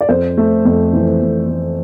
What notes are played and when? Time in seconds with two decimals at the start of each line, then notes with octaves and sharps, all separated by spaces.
0.01 D5
0.09 F2 C5
0.38 A3
0.65 F2
0.93 E3
1.21 F2
1.48 A3